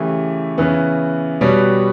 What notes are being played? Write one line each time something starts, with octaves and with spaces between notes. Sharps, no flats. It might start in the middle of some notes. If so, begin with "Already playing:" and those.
Already playing: C#3 E3 A3 E4 G4
C#3 E3 B3
B2 G3 B3 F#4 C#5